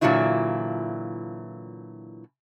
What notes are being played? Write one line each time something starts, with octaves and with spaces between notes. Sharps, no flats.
A#2 D3 E3 F#3 E4 F4